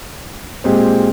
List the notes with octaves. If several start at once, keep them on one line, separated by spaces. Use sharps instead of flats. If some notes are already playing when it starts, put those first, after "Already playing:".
A#2 G#3 C4 G4